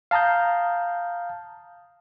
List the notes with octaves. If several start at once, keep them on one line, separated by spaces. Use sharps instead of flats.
F5 A5 A#5 D#6 G6